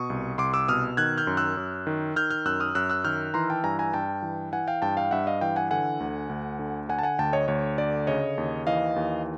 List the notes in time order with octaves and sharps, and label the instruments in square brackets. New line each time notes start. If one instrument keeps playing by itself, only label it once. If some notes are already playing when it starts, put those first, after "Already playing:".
Already playing: [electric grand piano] B2 C#6 D#6
C2
C2 C6 D6
D6 E6
B2 D#6 F6
D#3 F#6 G#6
F6 G6
F#2
E6 F#6
F#2
D#3
D#3 F6 G6
F6 G6
F#2 E6 F#6
D#6 F6
F#2 E6 F#6
E6 F#6
D#3 F6 G6
E3 A#5 C6
G5 A5
G2 G#5 A#5
G#5 A#5
G2 G5 A5
E3
E3 F#5 G#5
F5 G5
G2 G5 A5
F5 G5
G2 E5 F#5
D#5 F5
E3 F5 G5
F#5 G#5
D3 F#5 G#5
D2
D2
D3
D3 F#5 G#5
A5
F#5 G#5
D2 G5 A5
C#5 D#5
D2 C#5
D3 D5
C#3 C#5 D#5
D#2
E3 D#5 F5
D#2